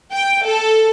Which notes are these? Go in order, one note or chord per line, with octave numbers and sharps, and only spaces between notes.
G5
A4